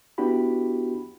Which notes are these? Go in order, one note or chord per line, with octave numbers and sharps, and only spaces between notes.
B3 D4 E4 F#4 G4 B5